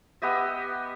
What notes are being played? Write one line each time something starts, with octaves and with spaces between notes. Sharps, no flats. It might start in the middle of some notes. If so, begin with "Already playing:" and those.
B3 G4 D#5 E5